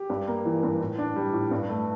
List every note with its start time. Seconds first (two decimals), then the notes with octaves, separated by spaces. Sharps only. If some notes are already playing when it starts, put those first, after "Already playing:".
Already playing: G4
0.10 G2
0.28 A#3
0.45 E3
0.63 G2
0.81 A2
0.98 D4
1.16 G3
1.33 A2
1.51 G2
1.69 A3